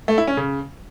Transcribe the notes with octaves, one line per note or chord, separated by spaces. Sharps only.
A3
E4
C#4
C#3